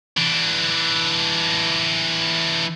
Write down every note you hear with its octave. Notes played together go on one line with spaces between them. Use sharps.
E3 D4